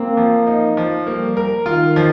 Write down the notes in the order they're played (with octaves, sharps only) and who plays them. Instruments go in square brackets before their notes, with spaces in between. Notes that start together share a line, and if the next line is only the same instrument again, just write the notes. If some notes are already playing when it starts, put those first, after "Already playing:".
Already playing: [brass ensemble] A#3 [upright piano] C4
[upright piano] F3
D#4
F3
[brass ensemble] G3 [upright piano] A#3
[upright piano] A#4
[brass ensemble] D#3 [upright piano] F4
[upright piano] F3